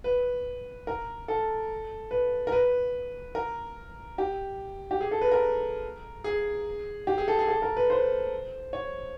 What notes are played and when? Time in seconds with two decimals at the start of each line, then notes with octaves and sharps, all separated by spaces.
0.04 B4
0.87 A#4
1.28 A4
2.11 B4
2.47 A#4
2.52 B4
3.35 A#4
4.18 G4
4.91 G4
5.01 G#4
5.11 A4
5.21 B4
5.32 A#4
6.24 G#4
7.07 G4
7.18 G#4
7.28 A4
7.39 G#4
7.48 A4
7.62 A#4
7.77 B4
7.90 C5
8.73 C#5